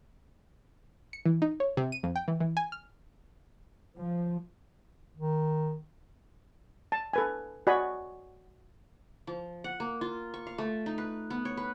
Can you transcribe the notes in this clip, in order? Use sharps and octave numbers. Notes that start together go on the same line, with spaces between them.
C#7
E3
D#4
C#5
C3
D#7
F2
G5
E3
E3
G#5
F6
F3
D#3
A5
A4 B4 G#5
F#4 D5 D#5 G#5 B5
F3
F#5
A#3
F4
C#6
F5
A3
D#4
B4
B3
C#5
B4